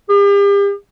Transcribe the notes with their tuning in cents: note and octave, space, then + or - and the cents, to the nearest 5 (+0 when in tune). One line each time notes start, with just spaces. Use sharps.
G4 +40